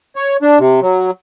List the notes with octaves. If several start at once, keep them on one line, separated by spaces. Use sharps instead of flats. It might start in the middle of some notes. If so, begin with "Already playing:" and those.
C#5
D4
C3
F#3